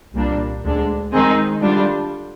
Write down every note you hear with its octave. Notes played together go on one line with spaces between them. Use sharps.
C2 A#2 G3 A#3 D4
D2 D3 G#3 D4
D#3 G#3 C4 D#4 G#4
D3 G3 D4 F4